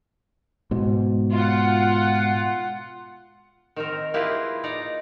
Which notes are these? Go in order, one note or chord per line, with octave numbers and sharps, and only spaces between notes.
G#2 B2
F4 F#5
D#3 C4 A#4
A#3 E4 F4 G4 G#4 B4
D#4 D5 A#5